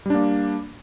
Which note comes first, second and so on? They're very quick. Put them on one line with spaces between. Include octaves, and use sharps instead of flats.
G3 D4 A#3